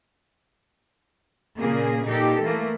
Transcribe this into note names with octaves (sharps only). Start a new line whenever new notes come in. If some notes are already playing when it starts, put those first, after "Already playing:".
A#2 C#3 A#3 G#4
A#2 D#4 G4 A4
E3 A3 A#3